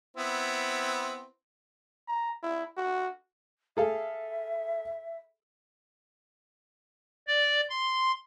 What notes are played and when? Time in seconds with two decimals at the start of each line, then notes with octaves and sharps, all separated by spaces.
0.17 B3 C4 E4
2.08 A#5
2.43 E4
2.77 F#4
3.77 G#4 A4 E5 F5
7.27 D5
7.70 C6